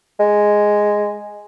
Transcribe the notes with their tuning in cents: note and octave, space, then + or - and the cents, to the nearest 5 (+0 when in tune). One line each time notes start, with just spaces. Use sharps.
G#3 +0